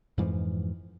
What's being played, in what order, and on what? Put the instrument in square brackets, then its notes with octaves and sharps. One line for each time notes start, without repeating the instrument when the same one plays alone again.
[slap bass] F2 G#2 E3 F3